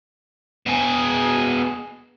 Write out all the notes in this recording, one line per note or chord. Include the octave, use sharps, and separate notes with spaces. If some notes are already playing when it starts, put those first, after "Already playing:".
B2 G#4